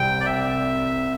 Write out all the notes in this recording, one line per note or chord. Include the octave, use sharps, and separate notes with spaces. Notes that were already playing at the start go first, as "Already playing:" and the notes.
Already playing: C2 C3 G3 C4 G5
D5
E5